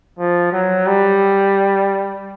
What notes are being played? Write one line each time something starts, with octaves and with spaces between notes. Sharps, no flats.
F3
F#3
G3